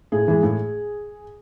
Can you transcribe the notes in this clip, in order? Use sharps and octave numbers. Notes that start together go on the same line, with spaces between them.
A2 G#4
E3 G#3
A2